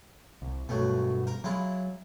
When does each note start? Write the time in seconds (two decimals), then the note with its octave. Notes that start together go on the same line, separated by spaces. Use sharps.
0.42 C2
0.69 G2 B2 F#3 A3
1.27 A#4
1.44 F#3 G#3 E4 F4